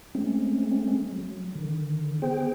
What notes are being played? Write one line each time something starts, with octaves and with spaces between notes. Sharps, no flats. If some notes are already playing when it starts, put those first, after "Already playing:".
G#3 A3 C4 C#4
F#3
D3 D#3
B3 G#4 C5 G5